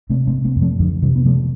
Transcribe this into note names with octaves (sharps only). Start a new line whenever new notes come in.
C3 A3 C4
A3 C4
C3
A3 C4
F2
F3 A3
F2 D3 F3
C3 E3 G3
B3
C3 F3 A3